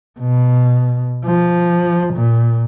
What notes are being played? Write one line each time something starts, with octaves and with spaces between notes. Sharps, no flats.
B2
F3
A#2